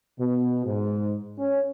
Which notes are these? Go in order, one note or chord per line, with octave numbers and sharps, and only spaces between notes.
B2
G#2
C#4